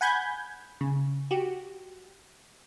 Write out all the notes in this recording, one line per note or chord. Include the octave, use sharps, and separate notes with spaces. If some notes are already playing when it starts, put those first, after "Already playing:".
F#5 G#5 B5 G6 G#6
C#3
F#4 G4